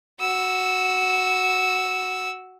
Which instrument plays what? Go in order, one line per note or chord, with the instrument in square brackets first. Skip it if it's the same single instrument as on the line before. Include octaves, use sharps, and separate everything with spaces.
[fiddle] F#4 E6